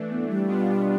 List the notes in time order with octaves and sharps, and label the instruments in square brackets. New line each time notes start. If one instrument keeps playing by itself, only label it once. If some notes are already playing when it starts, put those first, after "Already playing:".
Already playing: [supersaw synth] E3 A3 D4
[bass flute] B3
G3
[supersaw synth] B2 B3 D4 F4